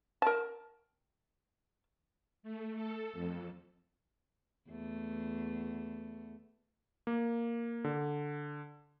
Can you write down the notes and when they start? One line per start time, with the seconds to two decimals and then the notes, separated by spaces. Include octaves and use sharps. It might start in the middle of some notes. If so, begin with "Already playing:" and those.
0.22 A#4 A5
2.43 A3
2.75 A4
3.13 F2
4.70 E2 A3
7.07 A#3
7.84 D3